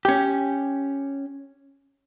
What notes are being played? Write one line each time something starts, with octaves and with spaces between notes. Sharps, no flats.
C#4 G4